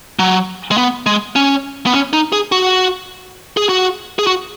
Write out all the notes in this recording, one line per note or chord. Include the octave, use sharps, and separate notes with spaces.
F#3
G#3
B3
G#3
C#4
B3
C#4
D#4
G#4
F#4
G#4
F#4
G#4
F#4